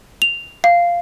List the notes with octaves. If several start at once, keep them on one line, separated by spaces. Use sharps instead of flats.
F7
F5